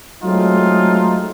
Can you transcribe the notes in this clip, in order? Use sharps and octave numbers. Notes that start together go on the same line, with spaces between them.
F#3 G#3 A3 C4 D#4 F4